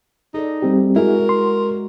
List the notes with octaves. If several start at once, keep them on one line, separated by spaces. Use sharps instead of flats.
D#4 G#4 A4 D5
G3 C4 G4
G#3 E4 F#4 G#4 A#4
C6